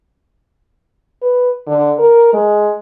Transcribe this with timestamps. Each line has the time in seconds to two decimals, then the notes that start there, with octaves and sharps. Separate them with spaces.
1.22 B4
1.67 D3
1.99 A#4
2.33 G#3